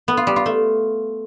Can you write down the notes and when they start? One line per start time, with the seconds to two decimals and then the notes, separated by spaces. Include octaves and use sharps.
0.08 B3
0.17 F4
0.27 G3
0.36 F4
0.46 A3